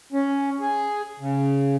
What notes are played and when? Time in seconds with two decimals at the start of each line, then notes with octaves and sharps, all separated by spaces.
0.12 C#4
0.60 G#4
1.20 C#3